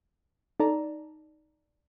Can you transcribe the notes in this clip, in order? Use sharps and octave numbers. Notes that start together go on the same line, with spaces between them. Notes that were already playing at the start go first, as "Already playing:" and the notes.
D#4 A4 D5 A5 A#5